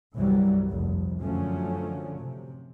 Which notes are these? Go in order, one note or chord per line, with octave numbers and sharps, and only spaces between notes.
C2 G2 E3 F#3 G3
F1
F#2 D3 F3 F#3 A3 C#4
C3